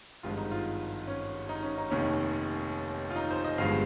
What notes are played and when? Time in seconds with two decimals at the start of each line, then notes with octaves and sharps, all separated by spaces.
0.23 G#1 G2 F3 G#3 F4
0.37 D#4
0.52 F4
1.07 C#4
1.49 D#4
1.63 C#4
1.78 D#4
1.90 F1 D#2 D#3 C#4
3.10 F4
3.16 D#4
3.31 C5
3.44 D#5
3.58 G1 G2 F3 G#3 F5